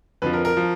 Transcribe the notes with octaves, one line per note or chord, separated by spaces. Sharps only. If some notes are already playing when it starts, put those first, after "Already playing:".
F2 D3 F3 B4
A#4
A#4
F3